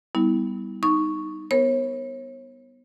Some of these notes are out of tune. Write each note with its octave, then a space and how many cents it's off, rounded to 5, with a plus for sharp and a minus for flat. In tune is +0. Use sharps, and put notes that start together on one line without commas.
G3 +0 B3 +0 E4 -35
D#4 +0 C#6 +0
B3 +0 A#4 +0 C#5 -40